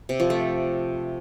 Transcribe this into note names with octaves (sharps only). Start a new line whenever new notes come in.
C3
F3
A3